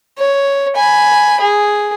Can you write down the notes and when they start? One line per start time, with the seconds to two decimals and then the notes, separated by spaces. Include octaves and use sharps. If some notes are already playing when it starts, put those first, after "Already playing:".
0.18 C#5
0.76 G#5 B5
1.40 G#4